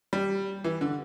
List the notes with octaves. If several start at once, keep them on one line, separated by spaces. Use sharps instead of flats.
G3
E3
D3